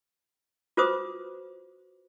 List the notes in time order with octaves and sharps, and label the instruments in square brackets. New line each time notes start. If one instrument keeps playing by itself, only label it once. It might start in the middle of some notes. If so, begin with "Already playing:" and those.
[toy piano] F4 F#4 B4 C5 D6 D#6